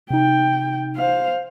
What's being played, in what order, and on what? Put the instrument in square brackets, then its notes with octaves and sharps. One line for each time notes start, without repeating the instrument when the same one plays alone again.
[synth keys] C3 D#4 [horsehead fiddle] G5
[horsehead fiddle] C5 F5